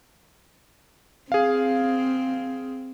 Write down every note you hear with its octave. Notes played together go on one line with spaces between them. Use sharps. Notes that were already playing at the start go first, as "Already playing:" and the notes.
C4 G#4 F5